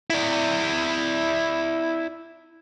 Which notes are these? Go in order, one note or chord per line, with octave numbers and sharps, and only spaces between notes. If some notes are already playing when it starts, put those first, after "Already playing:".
E4 D5